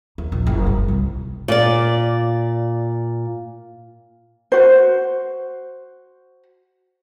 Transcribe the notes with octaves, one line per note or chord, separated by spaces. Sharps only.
D#2
A#1
F#1
G2
C2
A#2 D5
F#4 C5